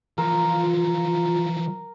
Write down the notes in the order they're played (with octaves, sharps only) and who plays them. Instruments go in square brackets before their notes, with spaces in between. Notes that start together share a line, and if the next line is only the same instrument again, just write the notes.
[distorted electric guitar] E3 F3 [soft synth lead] F4 [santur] A#4